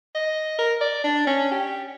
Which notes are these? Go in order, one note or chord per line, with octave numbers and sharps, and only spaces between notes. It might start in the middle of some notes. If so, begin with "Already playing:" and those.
D#5
A#4
D5
D4
C#4
G4